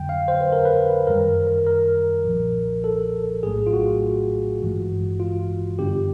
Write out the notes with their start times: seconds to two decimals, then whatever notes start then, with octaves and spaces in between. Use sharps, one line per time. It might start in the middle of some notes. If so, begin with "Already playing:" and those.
Already playing: F2 D3 F#3 G5
0.09 F5
0.28 C5
0.41 B4
0.52 A#4
0.65 B4
1.07 F#2 D#3 G3 A#4
1.47 A#4
1.66 A#4
2.25 B1 A#2 F3
2.84 A4
3.43 A#1 A2 F#3 A3 G#4
3.67 F4
3.73 F#4
4.61 G#1 G2 E3 G#3
5.20 F4
5.79 F#2 D3 G3 B3 D4 G4